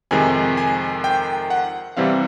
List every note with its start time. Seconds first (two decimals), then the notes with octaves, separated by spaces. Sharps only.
0.11 F2 C3 D#3 G#3 G#5
0.57 G#5
1.04 G5
1.50 F#5
1.97 C3 E3 G3 C4 F5